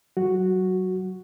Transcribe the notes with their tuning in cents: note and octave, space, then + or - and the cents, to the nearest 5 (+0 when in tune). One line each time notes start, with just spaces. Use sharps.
F#3 +20 F#4 +0